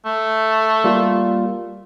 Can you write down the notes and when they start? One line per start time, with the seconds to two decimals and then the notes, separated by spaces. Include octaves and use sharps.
0.05 A3
0.84 G3 A#3 F4